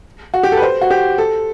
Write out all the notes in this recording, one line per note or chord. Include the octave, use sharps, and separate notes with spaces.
F#4
G4
A4
B4
C5
F#4
G4
A4